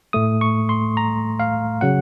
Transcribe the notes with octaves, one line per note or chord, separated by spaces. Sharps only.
A2 A3 D#6
C#6
C6
A#5
F5
C#3 F#3 F#5